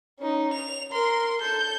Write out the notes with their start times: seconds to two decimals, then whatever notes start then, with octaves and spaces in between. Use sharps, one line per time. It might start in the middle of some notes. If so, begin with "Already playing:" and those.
0.20 C#4 D#4
0.53 F7
0.91 A#4 C6
1.41 A4 G6